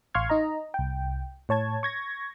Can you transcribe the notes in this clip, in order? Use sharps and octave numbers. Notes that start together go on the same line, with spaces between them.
A1 F5 C6 C#6 F6 G#6
D#4 D#5 A#5
C2 G5
A2 C#5 A5 G#6
C#6 G#6 A#6